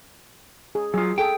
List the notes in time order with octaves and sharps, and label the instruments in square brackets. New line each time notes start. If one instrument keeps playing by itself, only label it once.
[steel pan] G#4
[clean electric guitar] F#3 F4 [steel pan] G#4
[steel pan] G#4 A4 [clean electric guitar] G5